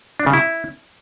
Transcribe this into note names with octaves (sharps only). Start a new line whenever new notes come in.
D4
C#3
E4